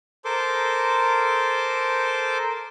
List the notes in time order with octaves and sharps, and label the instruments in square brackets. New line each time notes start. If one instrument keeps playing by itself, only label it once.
[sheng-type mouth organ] A4 A#4 C5 C6 D6